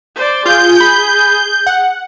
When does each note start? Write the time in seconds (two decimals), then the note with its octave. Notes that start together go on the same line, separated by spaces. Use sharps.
0.16 C5 D5
0.46 F4 G#4 G6
0.80 B5
1.66 F#5